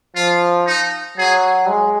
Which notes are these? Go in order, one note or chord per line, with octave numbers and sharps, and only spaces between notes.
F3 F4
D#4
F#3 G#4
G#3